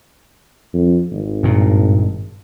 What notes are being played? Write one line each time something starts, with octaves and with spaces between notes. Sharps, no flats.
F2
G#1
G2 A#2